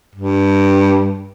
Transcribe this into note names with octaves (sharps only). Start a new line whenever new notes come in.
G2